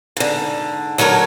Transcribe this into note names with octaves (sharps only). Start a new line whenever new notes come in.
G#2 D3
D2 F#3 A4 A#4 C#5